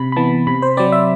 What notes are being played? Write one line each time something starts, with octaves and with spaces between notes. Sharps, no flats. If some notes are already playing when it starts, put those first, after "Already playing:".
Already playing: C3 B5
B5
E3 B3 A5
C3 B5
C5
F#3 C4 D5
E5